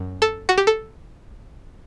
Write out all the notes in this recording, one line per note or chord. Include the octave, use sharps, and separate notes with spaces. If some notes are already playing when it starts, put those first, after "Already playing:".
Already playing: F#2
A4
F#4
G4
A4